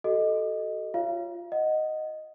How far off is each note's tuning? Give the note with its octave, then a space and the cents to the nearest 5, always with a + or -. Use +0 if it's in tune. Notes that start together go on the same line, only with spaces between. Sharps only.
F#4 +45 A4 -5 D#5 +0
F4 +0 C#5 +0 F5 -35
D#5 +0 F#5 +0